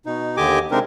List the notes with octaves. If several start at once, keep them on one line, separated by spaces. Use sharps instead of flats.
B2 D#4
D#2 D3 G4 D#5 G#5 D6
C3 G#3 C4 D4 D#4 A#4